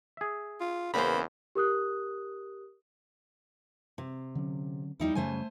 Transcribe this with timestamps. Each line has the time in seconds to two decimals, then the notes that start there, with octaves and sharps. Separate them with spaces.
0.17 G#4 E5
0.61 F4
0.94 E2 C#3 A#3 C5 B5
1.55 G4 A#4 D#6 F#6
3.98 C3
4.35 D3 F#3 C#4
5.00 E2 F3 G3 D#4 E4
5.15 F#2 C#3 G3 A3 C5 G#5